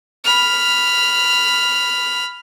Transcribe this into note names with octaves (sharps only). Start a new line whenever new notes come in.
B5 F6